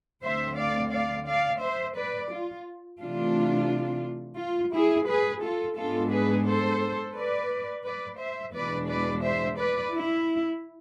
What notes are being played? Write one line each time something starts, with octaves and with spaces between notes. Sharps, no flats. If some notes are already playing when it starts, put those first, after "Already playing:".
D2 D3 A3 C4 C5 E5
D5 F5
D5 F5
D5 F5
C5 E5
B4 D5
F4
C3 E3 A3 D4 F4
F4
E4 G#4
G#4 B4
F4 A4
G#2 G#3 B3 D4 F4 A4
G#4 B4
A4 C5
B4 D5
B4 D5
C5 E5
E2 B2 G#3 D4 B4 D5
B4 D5
C5 E5
B4 D5
E4